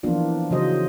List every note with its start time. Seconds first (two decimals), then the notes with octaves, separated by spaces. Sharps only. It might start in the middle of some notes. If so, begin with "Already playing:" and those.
0.03 E3 F3 A#3 B3 D4 F4
0.51 C#3 E3 F#3 C5 D#5